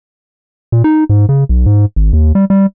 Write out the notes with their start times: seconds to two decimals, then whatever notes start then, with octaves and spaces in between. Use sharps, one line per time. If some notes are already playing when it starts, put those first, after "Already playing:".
0.72 A#2
0.84 D#4
1.09 G#2
1.29 C#3
1.49 B1
1.66 G#2
1.96 G#1
2.13 D#2
2.35 G3
2.50 G3